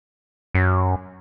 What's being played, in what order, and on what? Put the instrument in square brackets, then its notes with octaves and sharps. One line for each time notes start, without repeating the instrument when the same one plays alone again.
[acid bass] F#2